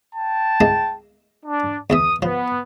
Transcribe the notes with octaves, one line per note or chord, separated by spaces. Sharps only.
G5 A5
G#3 A#3 E4
D4
E2 E3 E5 D#6
F3 B3